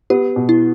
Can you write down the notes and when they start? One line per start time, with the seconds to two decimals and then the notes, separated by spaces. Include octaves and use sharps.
0.10 B3 G4
0.36 B2
0.49 E4